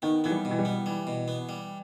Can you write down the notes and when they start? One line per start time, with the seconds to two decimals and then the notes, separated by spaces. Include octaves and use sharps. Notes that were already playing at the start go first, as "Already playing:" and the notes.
0.02 D#3 B3
0.24 E3 B3
0.31 G3
0.45 B2
0.51 E3
0.59 G3
0.65 B3
0.86 E3 G3
1.07 B2
1.28 B3
1.49 G3